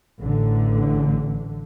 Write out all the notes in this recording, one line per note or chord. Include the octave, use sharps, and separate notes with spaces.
A1 A2 D3